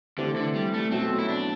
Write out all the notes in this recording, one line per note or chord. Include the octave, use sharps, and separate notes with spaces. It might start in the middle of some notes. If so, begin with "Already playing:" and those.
D3 E3 A3 C4 G4
D3
G3
A3
B2 F#3 A3 C4
E4
D4